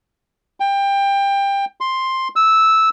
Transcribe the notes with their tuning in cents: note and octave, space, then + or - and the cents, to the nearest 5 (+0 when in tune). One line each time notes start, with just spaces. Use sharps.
G5 +20
C6 +5
E6 -10